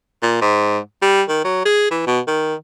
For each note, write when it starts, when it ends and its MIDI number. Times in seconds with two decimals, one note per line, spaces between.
0.23 0.40 46
0.42 0.78 44
1.02 1.22 55
1.29 1.40 51
1.45 1.63 54
1.65 1.88 68
1.91 2.03 52
2.07 2.20 47
2.28 2.55 51